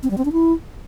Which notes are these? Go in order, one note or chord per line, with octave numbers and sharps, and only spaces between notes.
C4
G3
C4
D4
E4